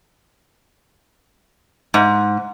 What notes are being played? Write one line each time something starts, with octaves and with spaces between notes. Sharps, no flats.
G#2